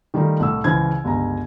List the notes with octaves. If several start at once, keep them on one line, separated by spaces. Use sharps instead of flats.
D#3 G3 A3 D#4 F4
C2 A2 E6
C#2 C#3 E3 C5 G#6
G1 C#2 G4 A#5